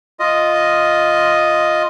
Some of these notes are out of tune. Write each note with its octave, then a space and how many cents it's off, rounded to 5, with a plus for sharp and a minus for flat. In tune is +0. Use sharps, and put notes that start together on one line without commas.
F4 +0 D#5 +0